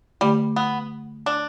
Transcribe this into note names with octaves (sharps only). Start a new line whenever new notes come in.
D3 G3 A3 G4
B3
D4